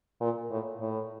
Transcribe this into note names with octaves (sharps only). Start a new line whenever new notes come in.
A#2
A2
A2